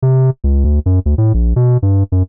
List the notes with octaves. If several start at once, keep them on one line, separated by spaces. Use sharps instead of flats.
C3
C#2
D2
F#2
D2
A2
A#1
B2
G2
F#2